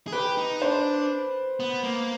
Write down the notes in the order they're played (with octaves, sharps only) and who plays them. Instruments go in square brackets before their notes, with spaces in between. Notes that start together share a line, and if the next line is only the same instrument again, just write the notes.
[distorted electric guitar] G#4
[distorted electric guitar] G4 [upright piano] B4
[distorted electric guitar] D#4
[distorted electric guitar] D4 [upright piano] C5
[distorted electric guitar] B3
A#3